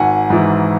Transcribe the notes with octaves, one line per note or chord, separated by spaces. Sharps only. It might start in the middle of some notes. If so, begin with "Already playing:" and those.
Already playing: G#1 F#5 G#5
G#2 E3